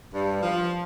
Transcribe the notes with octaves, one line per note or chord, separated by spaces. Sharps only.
G2
F3